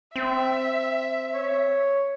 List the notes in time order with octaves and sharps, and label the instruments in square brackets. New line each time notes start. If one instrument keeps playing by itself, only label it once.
[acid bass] C4 [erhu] E5
[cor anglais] C#5